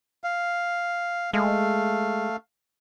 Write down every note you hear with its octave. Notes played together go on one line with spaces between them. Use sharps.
F5
G#3 A3 F5